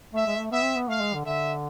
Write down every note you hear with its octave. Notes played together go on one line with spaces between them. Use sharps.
A3 E5
G#3
A3
B3 E5
C4
B3
A3 F5
G#3
D3
D3 E5